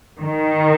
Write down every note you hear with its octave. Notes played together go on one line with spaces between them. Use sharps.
D#3